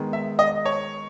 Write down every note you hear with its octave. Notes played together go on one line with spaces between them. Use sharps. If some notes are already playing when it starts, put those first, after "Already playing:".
Already playing: D#3 G#3 B3
E5
D#5
C#5